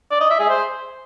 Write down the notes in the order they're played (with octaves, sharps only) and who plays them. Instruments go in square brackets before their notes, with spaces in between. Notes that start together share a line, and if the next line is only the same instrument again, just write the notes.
[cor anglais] D5
D#5
E5
G#4
C5